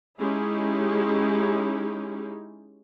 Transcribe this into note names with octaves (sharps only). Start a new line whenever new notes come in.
G#3 C#4 D#4 E4 G4 G#4